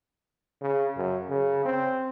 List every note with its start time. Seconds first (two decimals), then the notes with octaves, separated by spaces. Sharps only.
0.61 C#3
0.97 F#2
1.30 C#3
1.65 C4